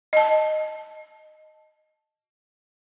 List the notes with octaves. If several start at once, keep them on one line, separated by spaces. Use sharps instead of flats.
D#5 A5